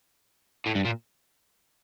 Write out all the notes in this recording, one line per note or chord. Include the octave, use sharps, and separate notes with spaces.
A2
G2
A#2